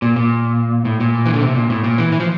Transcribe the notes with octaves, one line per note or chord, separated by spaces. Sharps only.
A#2
A#2
A2
A#2
E3
D3
C3
A#2
A2
A#2
E3
E3
F3